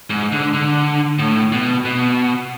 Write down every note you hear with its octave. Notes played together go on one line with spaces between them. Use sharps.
G#2
D3
D3
A2
B2
B2